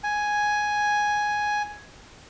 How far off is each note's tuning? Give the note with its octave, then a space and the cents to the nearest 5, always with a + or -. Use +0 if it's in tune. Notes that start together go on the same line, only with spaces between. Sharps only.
G#5 +5